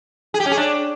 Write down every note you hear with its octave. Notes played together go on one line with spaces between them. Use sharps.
G#4
G4
C#4
G#4
D4